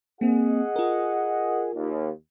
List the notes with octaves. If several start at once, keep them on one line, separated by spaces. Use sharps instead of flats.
A#3 C4 G#4 D#5 F#5
F4 A#4
D#2